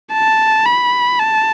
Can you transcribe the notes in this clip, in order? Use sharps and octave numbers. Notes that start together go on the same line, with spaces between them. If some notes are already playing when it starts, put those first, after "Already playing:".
A5
B5
A5